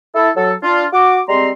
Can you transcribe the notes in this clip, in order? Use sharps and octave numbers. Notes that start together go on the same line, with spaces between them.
E4 A4
F#3 A4
D4 F4
F#4 D6
G3 G#3 C4 A#5 C6